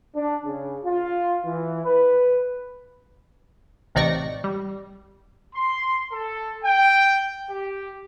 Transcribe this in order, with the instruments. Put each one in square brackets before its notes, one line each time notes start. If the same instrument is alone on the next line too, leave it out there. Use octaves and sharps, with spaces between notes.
[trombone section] D4
C#3
F4
E3
B4
[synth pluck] A1 C3 D#4 D5 C#6 A#6
G3
[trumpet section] C6
A4
G5
G4